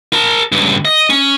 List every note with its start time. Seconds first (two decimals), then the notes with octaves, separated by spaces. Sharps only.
0.13 A#4 A5
0.52 C#2 G2
0.85 D#5
1.10 C#4